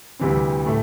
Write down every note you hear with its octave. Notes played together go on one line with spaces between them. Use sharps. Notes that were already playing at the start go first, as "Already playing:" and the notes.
D2 C3 E3 G3 C4
A2 A3